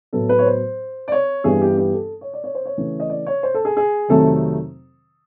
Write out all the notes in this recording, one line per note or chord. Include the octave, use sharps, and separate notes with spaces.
A2 F#3 B3 A4
B4
C#5
C5
D5
C#5
G2 E3 G3 B3 G#4
G4
G4
A4
C#5
D5
C#5
C5
C#5
C#3 E3 A3
D#5
D5
C#5
C5
A4
G#4
G#4
F2 C3 D#3 F#3 A3 A4